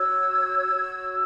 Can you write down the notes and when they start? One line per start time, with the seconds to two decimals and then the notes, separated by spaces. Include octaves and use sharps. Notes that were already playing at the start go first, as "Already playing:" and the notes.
Already playing: F#4 C#5 E6 G#6
0.73 F#4 C#5